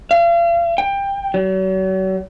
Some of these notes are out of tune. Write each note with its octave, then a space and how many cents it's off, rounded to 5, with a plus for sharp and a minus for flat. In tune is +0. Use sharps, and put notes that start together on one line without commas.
F5 -40
G5 +20
F#3 +40